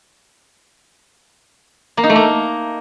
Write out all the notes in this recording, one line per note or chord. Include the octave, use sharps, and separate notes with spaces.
A#3
D#4
A3
A#3